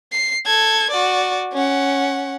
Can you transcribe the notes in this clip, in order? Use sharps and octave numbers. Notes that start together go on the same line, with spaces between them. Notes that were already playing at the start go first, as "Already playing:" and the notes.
C7
A4 G#6
F#4 D5
C#4 F#5